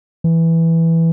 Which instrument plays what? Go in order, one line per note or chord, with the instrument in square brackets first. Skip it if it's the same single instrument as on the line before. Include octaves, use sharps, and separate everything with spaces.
[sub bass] E3